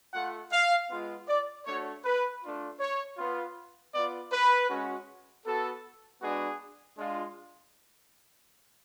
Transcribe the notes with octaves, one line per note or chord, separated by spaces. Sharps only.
A3 F4 F#5
F5
G#3 B3 F4
D5
A3 D4 F#4 C#5
B4
A3 D4 F4
C#5
B3 F4
B3 F4 D5
B4
G#3 C#4 F#4
B3 F#4 A4
G#3 B3 D4 F#4 G#4
G#3 D4 F4